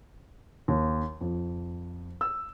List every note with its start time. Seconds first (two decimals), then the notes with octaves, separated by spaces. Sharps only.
0.68 D#2
1.21 F2
2.21 E6